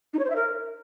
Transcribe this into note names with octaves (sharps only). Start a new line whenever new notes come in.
D#4
C#5
C5
E5
A#4